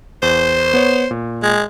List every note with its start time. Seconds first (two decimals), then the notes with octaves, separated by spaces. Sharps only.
0.22 E2 C5
0.74 B3 C#5
1.11 A#2
1.43 G#3